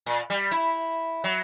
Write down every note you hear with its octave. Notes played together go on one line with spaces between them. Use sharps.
A#2
G3
E4
F#3